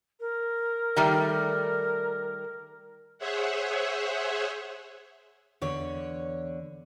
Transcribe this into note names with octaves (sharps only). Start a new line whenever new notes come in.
A#4
D#3 G3 A3
G#4 C5 C#5 E5 F#5
E2 D3 C#5